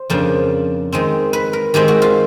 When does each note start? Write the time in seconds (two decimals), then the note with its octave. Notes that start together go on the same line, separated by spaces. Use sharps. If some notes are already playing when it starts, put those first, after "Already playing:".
Already playing: C5
0.10 F2 C#3 F3 A#3 D4
0.92 D#3 G#3 C4
1.33 B4
1.53 A#4
1.74 D#3 G#3 C4 G4
1.88 F#4
2.02 F4